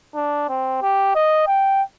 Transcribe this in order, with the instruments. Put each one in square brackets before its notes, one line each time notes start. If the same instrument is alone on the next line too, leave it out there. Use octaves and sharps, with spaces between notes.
[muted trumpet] D4
C4
G4
D#5
G5